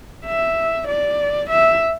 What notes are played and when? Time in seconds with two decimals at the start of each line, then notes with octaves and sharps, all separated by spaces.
0.26 E5
0.88 D5
1.50 E5